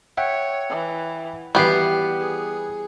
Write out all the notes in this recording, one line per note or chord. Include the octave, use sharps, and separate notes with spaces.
C#5 E5 F#5 G5
E3
E3 G3 B3 F#4 G4 F5 F#6 C7
G#4